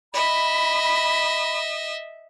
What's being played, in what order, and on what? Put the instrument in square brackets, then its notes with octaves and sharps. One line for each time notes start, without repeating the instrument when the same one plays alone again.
[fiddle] D#5 E5 [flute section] B5